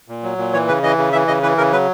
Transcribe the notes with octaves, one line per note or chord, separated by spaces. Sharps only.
A#2
F#3
A#2
E3 C#5
C#3 B4
E3 D#5
C#3
E3 E5
C#3 D#5
E3 B4
C#3 A#4
F#3 B4